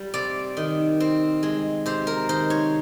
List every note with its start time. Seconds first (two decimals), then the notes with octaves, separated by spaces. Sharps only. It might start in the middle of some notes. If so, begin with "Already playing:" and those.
Already playing: G3
0.14 C3 D5
0.57 D#3
1.00 C4
1.43 G#3
1.86 C3 C5
2.07 A#4
2.29 D#3 C5
2.50 C#5